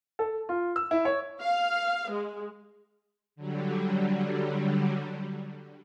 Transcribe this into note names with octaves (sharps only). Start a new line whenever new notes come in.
A4
F4
E6
E4
C#5
F5
G#3
D3 F#3 G3